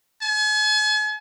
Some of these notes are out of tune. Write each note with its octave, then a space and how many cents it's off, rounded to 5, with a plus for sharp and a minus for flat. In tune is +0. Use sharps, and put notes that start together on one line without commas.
G#5 +45